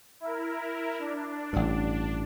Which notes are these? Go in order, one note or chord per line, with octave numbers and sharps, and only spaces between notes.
E4 A#4
D4
A1 G2